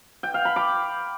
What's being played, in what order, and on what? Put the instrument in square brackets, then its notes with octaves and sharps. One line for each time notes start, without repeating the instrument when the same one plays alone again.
[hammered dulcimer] G5
F5
B5
D6